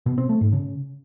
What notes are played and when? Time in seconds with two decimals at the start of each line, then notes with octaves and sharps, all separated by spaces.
0.06 B2
0.18 C4
0.29 A3
0.41 G#2
0.53 C#3